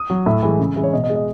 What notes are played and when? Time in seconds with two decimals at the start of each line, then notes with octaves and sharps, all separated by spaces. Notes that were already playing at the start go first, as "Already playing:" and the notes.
Already playing: D#6
0.10 F#3
0.26 A2 E5
0.43 E3 G#3
0.60 C#3
0.76 E3 G#3
0.83 C#5
0.93 B2 D#5
1.04 D#5
1.10 G#3
1.15 D#5